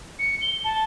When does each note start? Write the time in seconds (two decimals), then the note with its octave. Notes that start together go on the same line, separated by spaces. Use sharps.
0.19 C#7
0.42 G7
0.64 A5